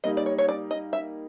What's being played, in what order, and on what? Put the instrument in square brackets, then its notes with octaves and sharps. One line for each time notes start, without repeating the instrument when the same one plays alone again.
[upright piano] G3 A#3 D#4 [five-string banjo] D#5
[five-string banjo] D5
C#5
C#5
D5
D#5
E5